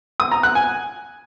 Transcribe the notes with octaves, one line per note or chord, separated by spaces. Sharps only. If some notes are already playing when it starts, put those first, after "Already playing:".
D#6
A#5
F#6
G#5